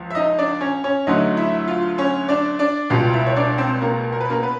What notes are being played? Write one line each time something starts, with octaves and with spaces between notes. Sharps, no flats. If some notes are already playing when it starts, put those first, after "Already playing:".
Already playing: C#2 F3
E5
D#4 D#5
D4 D5
C#4 C#5
C#4 C#5
D2 D3 F#3 A3 D#4 D#5
E4 E5
F4 F5
C#4 C#5
D4 D5
D4 D5
C#2 B2 G3 F4 F5
E4 E5
C#5
D4 D5
C4 C5
A#3 A#4
A#4
B4
A#3 A#4
B3 B4